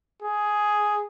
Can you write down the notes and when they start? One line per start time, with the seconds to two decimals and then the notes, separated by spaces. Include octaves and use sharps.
0.22 G#4